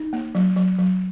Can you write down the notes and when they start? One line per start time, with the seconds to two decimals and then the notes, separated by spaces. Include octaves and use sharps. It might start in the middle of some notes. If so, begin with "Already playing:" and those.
Already playing: D#4
0.13 A#3
0.35 F#3
0.56 F#3
0.78 F#3